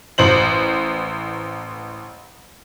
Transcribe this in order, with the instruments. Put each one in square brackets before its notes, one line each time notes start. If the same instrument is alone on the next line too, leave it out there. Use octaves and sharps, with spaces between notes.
[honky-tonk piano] A1 C5 F#7